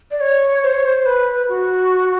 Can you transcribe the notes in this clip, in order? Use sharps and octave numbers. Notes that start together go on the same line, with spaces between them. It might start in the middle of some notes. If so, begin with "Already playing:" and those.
D5
C#5
C5
C#5
C5
B4
F#4